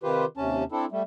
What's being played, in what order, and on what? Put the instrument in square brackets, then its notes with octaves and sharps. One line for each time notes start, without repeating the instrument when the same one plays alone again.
[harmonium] C3 D#3 F4 G4 B4 C5
D#2 C3 C#4 A5
C4 D4 E4 A4
G3 A3